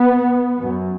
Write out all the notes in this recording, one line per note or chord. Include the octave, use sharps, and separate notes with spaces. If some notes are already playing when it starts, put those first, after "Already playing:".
Already playing: B3
F#2